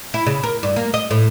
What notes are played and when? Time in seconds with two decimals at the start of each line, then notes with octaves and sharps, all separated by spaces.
0.14 E4
0.26 C#3
0.43 A#4
0.63 G2
0.76 A#3
0.94 D#5
1.11 A2